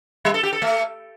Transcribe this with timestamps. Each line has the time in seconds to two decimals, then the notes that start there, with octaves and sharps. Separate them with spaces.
0.25 G3
0.34 A4
0.43 G4
0.53 A4
0.62 A3